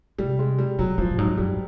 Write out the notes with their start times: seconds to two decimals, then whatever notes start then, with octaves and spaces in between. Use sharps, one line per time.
0.18 C3 G3
0.39 G#3
0.59 G3
0.79 B2 F#3
0.98 A#2 F3
1.11 A2
1.18 G#2 F#3
1.38 F#2 G3